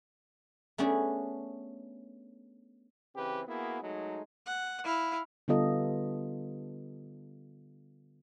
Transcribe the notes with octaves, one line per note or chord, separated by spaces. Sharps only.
A3 B3 C#4 D4 G#4
C#3 E3 C4 G4 B4
A#3 B3 E4 F#4 G#4
F#3 G#3 A3 D#4
F#5
E4 F5
D3 G3 B3 F4 A4 D#5